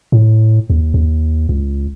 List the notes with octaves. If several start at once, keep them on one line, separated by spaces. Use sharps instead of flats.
A2
D#2
D#2
C#2